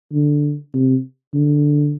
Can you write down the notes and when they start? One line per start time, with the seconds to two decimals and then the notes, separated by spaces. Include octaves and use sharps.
0.13 D3
0.74 C3
1.34 D3